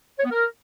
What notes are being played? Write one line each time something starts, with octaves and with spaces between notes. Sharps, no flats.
C#5
B3
A#4